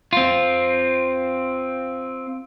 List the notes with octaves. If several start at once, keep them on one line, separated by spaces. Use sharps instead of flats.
C4 F4